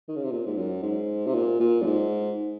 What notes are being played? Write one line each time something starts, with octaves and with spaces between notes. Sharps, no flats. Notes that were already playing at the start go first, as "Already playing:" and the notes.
D#3
C#3
C3
A#2
G#2
F#2
G#2
C3
A#2
A#2
F#2
G#2